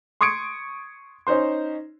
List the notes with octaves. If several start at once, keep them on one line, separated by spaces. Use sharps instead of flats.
C6 C#6 D#6 G#6 C#7 D7
C#4 D#4 C5 C6